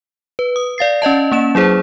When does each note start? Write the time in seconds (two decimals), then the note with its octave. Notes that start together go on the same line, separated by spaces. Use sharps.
0.39 B4
0.56 D#6
0.78 D5 F5 A6 C7
1.02 C#4 D5 D#5 A5
1.32 A#3 C#4 E7
1.55 F#3 E4 G#4 C5